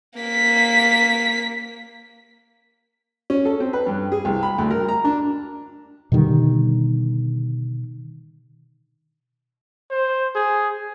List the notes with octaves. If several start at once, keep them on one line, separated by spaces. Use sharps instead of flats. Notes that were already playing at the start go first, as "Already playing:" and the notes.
A#3 B6
C#4
A4
C4
B4
G2
G#4
C2
B5
D2
A#4
A#5
D4
B2 D3 D#3 G3
C5
G#4